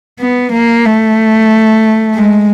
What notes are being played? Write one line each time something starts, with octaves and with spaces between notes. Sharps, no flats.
B3
A#3
A3
G#3